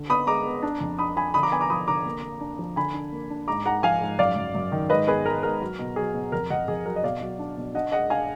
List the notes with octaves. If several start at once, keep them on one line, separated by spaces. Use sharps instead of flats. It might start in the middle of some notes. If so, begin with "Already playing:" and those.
Already playing: D3
B3 B5 D#6
G#3 A#5 D6
B3
D4
F2
D4 B5 D#6
F3 G#5 B5
D3 B5 D#6
A#5 D6
B3 G#5 B5
A#5 D6
F3 B5 D#6
D3 A#5 D6
A#3
A#3
D4
F3
D3 G#5 B5
D4
A#3
D4
G#2 A#5 D6
G#2 F#5 A#5
F3 F5 G#5
G#2
F#2 D5 F5
F#2
F#2
D#3
G#2 B4 D#5
B3 G#4 B4
G#3 A#4
G#2 A#4
F#3
B2
F#3 G#4
B2
F2 A#4
F2 D#5 F#5
F2 G#4
F#3 A#4
D#5
B2 D5 F5
F#3
D4
B2
D4 D#5 F#5
G#3 D#5 F#5
D4 F5 G#5